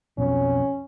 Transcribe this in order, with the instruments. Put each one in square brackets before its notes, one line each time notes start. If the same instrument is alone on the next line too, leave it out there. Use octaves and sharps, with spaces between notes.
[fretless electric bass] B1 F2 F#3 [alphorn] C#4